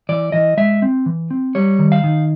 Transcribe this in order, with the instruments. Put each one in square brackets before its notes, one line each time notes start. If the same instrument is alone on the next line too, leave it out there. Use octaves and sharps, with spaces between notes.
[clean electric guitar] E3 D5
E3 D#5
G#3 E5
C4
E3
C4
G3 C#5
D#3
F5
D#3